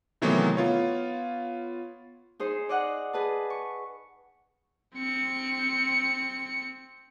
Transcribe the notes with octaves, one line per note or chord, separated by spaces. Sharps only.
C3 D#3 E3 F#3 A3 B3
B3 F4 C#5
D#4 G#4 C5
D5 D#5 F#5
G#4 B4 A5
C#6
C4 C#7